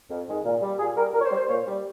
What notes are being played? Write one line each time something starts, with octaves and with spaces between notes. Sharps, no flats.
F2
D#3 G#3
A#2
G3
A#2 G#4
G3 A#4
A#2 A#4
C#5
C5
G3
C5
A#2 C#5
G3